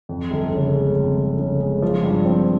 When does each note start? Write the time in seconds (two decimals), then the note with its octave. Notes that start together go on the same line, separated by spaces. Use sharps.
0.09 F2
0.31 G1
0.53 C#3
0.74 G#3
0.96 F2
1.17 G1
1.39 C#3
1.60 G#3
1.82 F3
2.03 G2
2.26 C4